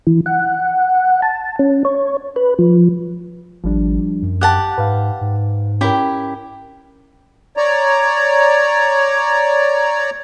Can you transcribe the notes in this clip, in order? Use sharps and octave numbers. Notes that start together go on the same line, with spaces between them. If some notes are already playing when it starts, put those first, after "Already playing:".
E3
F#5
A5
C#4
C#5
B4
F3
G#1 F3 G3 D4
F#2
G4 F#5 A5 F#6
G#2 B4 F5
G#2
C#4 E4 G4 A#4 G5
C#5 D5 A#5